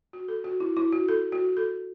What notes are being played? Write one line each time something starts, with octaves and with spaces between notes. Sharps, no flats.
F#4
A4
F#4
E4
E4
F#4
A4
F#4
A4